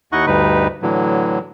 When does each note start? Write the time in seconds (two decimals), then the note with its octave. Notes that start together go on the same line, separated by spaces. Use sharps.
0.12 D#2 D#4 E4 D#5 F#5 C#6
0.27 D2 G2 D#4 B4
0.82 A2 D3 E3 F#3